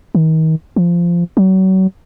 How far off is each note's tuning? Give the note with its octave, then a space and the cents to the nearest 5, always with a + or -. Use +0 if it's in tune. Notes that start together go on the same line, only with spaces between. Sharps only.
D#3 +35
F3 -15
F#3 +35